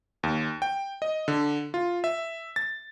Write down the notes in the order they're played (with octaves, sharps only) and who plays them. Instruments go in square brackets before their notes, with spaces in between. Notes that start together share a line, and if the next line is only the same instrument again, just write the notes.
[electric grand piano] D#2
G5
D#5
D3
F4
E5
A6